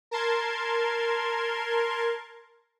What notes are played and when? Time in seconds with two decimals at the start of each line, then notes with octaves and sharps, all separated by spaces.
0.11 A#4 A5 C6 G#6